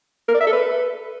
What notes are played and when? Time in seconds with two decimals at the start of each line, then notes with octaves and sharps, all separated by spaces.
0.28 A#4
0.34 D5
0.41 E5
0.47 A4
0.53 B4